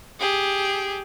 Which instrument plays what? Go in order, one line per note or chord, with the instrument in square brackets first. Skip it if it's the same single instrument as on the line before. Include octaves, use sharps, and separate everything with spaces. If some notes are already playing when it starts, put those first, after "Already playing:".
[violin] G4 G#4